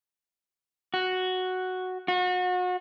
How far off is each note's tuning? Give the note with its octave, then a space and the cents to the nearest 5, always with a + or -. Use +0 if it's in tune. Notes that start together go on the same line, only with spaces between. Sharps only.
F#4 +0
F#4 -35